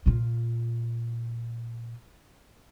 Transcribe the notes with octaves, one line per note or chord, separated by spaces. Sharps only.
A#2 F4